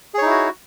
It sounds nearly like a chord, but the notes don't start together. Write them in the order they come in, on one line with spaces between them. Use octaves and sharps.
G#4 C#5 D#4 E4 F#4